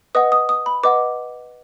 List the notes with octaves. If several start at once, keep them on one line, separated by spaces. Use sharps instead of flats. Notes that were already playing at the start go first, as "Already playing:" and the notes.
B4 D#5 F#5 D#6
D#6
D#6
B5
B4 D#5 F#5 D6